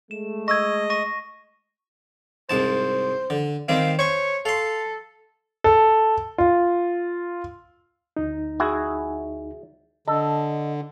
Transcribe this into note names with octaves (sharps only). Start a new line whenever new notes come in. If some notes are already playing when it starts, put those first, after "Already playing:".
G#3 A3 E7
D#5 C#6 E6 G#6 A#6
C#6 A#6 D#7
C2 G#2 C5 A5
D3
D#3 G3 C4 F5
C5 C#5 C#6
A4 F5 C6
A4
F4
D2 D#4
E4 F#4 G#4
D3 A4 D#5